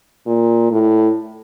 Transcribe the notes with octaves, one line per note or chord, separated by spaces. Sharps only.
A#2
A2